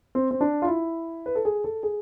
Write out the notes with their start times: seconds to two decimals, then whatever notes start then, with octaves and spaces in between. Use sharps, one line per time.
0.15 C4
0.31 C4
0.41 D4
0.62 F4
0.67 E4
1.26 B4
1.35 A4
1.45 G#4
1.64 A4
1.83 G#4